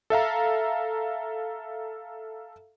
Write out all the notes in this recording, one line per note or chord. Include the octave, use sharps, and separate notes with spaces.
A4 E5 F5 A#5